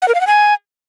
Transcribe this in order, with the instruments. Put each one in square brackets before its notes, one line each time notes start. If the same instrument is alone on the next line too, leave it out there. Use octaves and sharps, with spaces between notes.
[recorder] F#5
A#4
F5
F#5
G#5